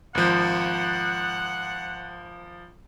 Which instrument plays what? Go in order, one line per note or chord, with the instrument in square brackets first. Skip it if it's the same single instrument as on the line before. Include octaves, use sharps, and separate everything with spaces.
[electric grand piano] G#1 F3 [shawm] F#5